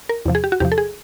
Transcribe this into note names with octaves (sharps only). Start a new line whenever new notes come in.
A#4
E2 C3 F3
G#4
G4
F#4
E2 C3 F3 G4
A4
G#4